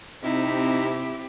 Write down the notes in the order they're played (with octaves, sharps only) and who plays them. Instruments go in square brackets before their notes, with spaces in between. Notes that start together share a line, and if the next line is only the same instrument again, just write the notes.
[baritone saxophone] C3 [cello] C4 G4 [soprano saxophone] D#4 [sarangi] E4